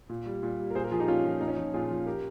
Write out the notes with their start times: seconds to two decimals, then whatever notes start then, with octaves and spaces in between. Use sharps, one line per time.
0.09 A#2
0.26 G3
0.43 A#2
0.60 G3
0.70 A#4
0.75 A#2 G#4 C5
0.84 G4 A#4
0.91 F3 F4 G#4
0.99 D#4 G4
1.08 A#2 C#4 F4
1.24 F3
1.41 A#2 D#4
1.48 C#4
1.55 F3 D#4
1.74 A#2 F4 G#4
1.91 F3
2.06 G4 A#4